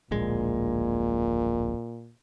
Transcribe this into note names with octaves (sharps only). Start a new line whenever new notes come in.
D1 A#1 A#2 G#3